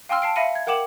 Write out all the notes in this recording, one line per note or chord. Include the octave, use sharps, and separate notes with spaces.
F5 G5 G#5 C6 E6 F6
A5 C7 D7
E5 F5 B5 A#6 C#7 D#7
G#6
A#4 F#5 G5 D6 E7 F#7